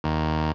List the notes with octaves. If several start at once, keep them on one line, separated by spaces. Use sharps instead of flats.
D#2